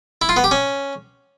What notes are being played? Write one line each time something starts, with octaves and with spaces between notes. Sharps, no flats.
E4
F4
B3
G4
C#4